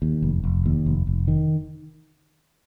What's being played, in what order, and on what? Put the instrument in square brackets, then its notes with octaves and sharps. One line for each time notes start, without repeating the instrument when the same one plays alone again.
[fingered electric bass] D#2
F1
F1
D#2
F1
F1
D#3